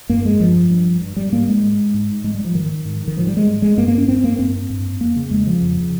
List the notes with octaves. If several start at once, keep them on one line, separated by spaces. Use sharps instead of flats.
G2 A#3
G#3
G2 F3
G2
G2
G3
G#2 A#3
G#3
G#2
G#2
G#2 G#3
G3
F3
G#2 D#3
G#2
D#3
G#2 F3
G3
G#3
G#2
G#3
G2 A#3
A#3
C#4
G2 C4
A#3
G2 C4
G2
F2 A#3
C#3
F2 G#3
C#3 F3
F2
C#3